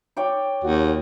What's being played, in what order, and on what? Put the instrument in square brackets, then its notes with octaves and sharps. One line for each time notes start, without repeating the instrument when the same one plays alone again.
[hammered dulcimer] C#5 D5 G5
[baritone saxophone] D#2 [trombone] F#4